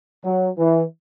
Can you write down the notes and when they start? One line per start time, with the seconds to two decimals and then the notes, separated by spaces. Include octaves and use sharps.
0.24 F#3
0.58 E3